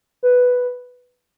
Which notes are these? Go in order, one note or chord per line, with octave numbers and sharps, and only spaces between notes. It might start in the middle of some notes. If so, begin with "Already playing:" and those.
B4